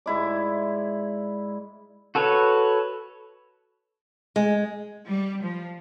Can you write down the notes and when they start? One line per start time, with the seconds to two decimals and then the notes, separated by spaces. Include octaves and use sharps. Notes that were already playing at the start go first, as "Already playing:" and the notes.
0.06 G#2 E4 D5
2.15 F#4 A4 B4 C#5
4.36 G#3
5.09 G3
5.43 F3